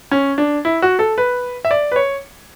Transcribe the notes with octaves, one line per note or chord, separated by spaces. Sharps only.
C#4
D4
E4
F#4
A4
B4
E5
D5
B4
C#5